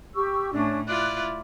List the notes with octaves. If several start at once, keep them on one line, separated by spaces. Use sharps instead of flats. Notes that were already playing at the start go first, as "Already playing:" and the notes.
G4 C#6 E6
A2 A3 C#4 D4
E4 F4 D5 F#6